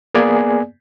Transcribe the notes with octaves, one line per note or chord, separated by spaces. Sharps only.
A#3 B3 G#4 D5 G#5